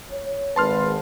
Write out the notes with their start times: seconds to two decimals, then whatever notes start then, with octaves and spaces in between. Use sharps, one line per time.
0.11 C#5
0.56 G#1 B4 A5 C6 F6